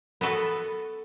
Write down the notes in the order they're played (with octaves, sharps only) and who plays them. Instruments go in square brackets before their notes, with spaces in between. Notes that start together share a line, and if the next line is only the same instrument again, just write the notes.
[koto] B3 F#4 A4 B4